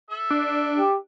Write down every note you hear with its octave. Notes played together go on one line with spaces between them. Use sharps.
A4 E5
D4
G4